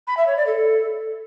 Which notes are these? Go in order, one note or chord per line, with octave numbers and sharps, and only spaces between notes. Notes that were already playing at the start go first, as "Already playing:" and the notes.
B5
E5
C#5
D5
A4